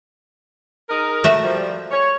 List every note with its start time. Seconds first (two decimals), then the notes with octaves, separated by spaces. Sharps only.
0.90 D#4 G#4 A#4
1.24 A3 F#4 E5
1.43 F3 G3
1.91 C#5